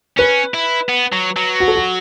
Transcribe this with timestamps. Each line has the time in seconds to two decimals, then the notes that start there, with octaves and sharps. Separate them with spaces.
0.18 C#4 B4
0.54 E4
0.89 B3
1.13 F#3
1.37 F#3
1.60 F#4
1.68 A4
1.76 F#4